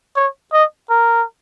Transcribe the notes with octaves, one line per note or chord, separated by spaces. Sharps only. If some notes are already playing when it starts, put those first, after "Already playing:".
C#5
D#5
A#4